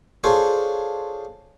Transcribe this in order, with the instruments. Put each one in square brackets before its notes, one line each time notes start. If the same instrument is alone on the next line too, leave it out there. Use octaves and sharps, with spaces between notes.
[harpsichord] D4 F4 G#4 A4 C5 C#5